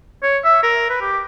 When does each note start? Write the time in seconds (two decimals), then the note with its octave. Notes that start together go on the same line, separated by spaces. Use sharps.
0.23 C#5
0.44 E5
0.63 A#4
0.90 B4
1.01 G4